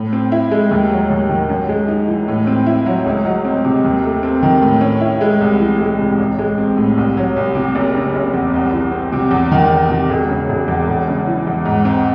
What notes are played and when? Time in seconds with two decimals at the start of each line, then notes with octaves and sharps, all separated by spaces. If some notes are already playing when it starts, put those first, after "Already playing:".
Already playing: A2
0.13 C4
0.32 E4
0.51 G#3
0.71 D#2
0.91 F#3
1.10 D#2
1.29 D#3
1.49 F#2
1.69 G#3
1.88 D#4
2.07 E3
2.28 A2
2.47 C4
2.66 E4
2.86 F#3
3.06 C#2
3.25 F#3
3.45 C4
3.65 C3
3.84 D#2
4.04 A3
4.23 C4
4.43 D#3
4.62 A2
4.81 C#4
5.01 E4
5.21 G#3
5.41 C2
5.60 E3
5.80 G#3
5.99 C3
6.18 A1
6.39 G#3
6.58 C4
6.77 A2
6.97 C2
7.17 F#3
7.36 C2
7.55 C3
7.75 F#1
7.95 C#3
8.15 F#1
8.34 E2
8.54 C2
8.73 E3
8.92 C4
9.12 C3
9.31 E2
9.51 D#3
9.71 E2
9.90 C3
10.09 E1
10.29 C#3
10.49 E1
10.68 E2
10.88 E1
11.08 C#3
11.27 E3
11.47 E2
11.65 G#2
11.85 C4